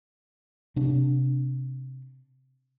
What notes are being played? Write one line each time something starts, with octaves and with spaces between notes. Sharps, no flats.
C3 C4 D4